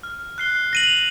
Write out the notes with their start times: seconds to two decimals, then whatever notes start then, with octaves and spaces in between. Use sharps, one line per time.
0.03 F6
0.38 F#6 C7 G7
0.73 A#6 D#7 F#7
0.87 F7